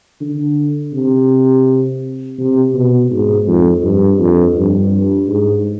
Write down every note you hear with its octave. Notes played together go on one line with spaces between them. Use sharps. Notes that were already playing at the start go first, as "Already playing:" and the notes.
D3
C3
C3
B2
G#2
F2
G2
F2
G2
G#2